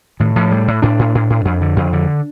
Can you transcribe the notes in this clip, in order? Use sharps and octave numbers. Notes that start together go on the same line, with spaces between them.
A2 D#3
A2 F3
A2 G3
A2
A2 D4
A2
A2
A2
F2
D3
F2
D3